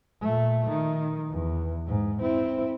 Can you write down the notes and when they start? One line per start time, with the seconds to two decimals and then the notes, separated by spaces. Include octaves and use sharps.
0.23 A#2 A3
0.69 D#3
1.31 E2
1.87 G#2
2.22 C4 E4